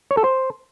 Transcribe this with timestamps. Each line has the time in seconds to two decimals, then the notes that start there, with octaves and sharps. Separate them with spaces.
0.11 C#5
0.17 A4
0.24 C5